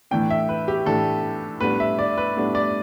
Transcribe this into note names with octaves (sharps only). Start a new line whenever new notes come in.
A2 E3 A3 D4 G5
E5
B4
G4
A2 E3 A3 D4 A4
A2 G3 B3 D4 B4
E5
D5
B4
A2 G3 B3 D4
D5